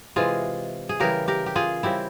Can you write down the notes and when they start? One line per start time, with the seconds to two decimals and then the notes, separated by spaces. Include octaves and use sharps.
0.16 C3 E3 G#3 F4 G#4
0.89 G#4
1.00 C#3 E3 G3 G4 A#4
1.28 G4 A#4
1.46 G4
1.56 F4 G#4
1.83 C#3 G3 C4 E4 G4